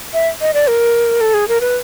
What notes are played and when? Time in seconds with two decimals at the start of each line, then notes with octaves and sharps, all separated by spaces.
0.14 E5
0.41 D#5
0.54 D5
0.68 A#4
1.21 A4
1.34 G#4
1.48 A#4
1.61 B4